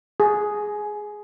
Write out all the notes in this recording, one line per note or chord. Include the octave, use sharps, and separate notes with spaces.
G#4